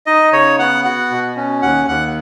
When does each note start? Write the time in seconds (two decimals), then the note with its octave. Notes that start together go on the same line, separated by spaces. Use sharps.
0.06 D#4 D#5
0.33 C#3 C#5
0.59 B3 F#5
0.85 F#4 F#5
1.11 B2
1.36 C#4
1.62 D#2 F#5
1.88 D#2 F#5